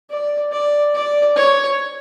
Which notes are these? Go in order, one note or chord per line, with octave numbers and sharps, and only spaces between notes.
D5
D5
D5
C#5